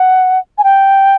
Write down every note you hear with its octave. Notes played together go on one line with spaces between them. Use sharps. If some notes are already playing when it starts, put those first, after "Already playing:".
Already playing: F#5
G#5
G5